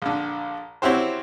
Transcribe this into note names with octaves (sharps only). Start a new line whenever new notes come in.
A#1 D3
C4 C#4 E4 F#4 G4 C5